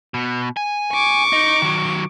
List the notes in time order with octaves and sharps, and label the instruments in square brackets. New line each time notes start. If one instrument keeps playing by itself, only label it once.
[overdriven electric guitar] B2
G#5
[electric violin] C#6 D6
[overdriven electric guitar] D#4
D#3 F#3